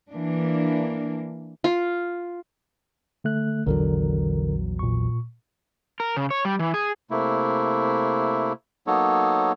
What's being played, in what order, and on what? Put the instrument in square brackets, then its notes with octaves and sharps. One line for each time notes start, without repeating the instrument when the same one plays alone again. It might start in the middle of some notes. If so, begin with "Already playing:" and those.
[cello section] E3 A#3 D4
[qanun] F4
[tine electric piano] D3 A3 F#6
[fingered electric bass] A#1 E2 F#3 [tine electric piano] D3 A#4
[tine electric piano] A#2 C#6
[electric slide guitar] A#4
C#3
C#5
G3
E3
G#4
[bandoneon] C3 A3 A#3 E4
F#3 A#3 B3 D#4 A4 C#5